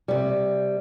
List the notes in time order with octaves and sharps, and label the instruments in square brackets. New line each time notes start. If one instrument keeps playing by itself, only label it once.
[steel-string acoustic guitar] C3 G3